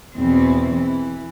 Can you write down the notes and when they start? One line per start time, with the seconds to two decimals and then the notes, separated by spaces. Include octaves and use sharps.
0.16 E2 B2 E3 C4
0.74 E3